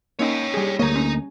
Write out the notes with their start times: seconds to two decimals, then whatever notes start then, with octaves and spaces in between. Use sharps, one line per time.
0.19 A#3 C#4 D#4 C#5 G5
0.54 G3 G#4
0.79 D2 A#3 C#5 D#5 A#5
0.95 C#4